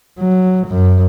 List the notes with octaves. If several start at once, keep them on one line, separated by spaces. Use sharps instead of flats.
F#3
F#2